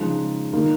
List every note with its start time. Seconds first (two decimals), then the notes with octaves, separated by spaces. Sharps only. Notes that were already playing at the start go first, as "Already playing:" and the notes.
Already playing: C#3 F3 G#3 D#4
0.53 D#3 A#3 D#4